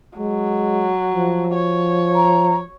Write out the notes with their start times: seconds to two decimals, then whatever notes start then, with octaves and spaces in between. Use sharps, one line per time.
0.18 F#3 G#3
1.11 F3
1.54 C#5
2.15 A#5